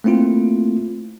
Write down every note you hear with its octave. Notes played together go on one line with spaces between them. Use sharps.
A3 A#3 C4 E4 F4